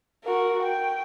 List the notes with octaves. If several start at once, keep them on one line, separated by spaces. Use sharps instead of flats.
F#4 A#4
G5